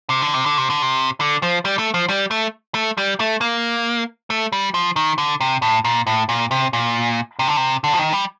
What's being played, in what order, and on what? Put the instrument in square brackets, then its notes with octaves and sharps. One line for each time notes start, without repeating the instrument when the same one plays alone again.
[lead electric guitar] C3
D3
C3
D3
C3
D3
C3
D3
F3
G3
A3
F3
G3
A3
A3
G3
A3
A#3
A3
G3
F3
D#3
D3
C3
A2
A#2
A2
A#2
C3
A#2
C3
D3
C3
D3
F3
D#3
G3